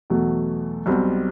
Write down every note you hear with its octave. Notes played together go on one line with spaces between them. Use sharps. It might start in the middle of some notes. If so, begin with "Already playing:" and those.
E2 B2 F#3 A3
B1 B2 G3 C4